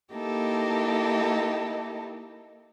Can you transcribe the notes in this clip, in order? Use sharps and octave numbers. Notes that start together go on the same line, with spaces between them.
A#3 D#4 E4 G4 A4